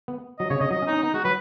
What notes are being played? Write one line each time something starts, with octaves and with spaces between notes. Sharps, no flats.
B3
F#3 D#5
C#3 C#5
C#3 D#5
F#3 D#5
C#4
D#4
C#4
B3 D#4
G#3 F#4
F#3 B4